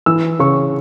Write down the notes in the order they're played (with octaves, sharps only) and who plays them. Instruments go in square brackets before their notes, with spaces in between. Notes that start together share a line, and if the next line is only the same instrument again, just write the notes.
[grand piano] E3 E6
C#3 C#6